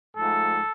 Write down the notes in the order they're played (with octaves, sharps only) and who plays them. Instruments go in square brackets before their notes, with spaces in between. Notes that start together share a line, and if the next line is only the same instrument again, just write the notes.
[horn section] G#2 F3 A3 A4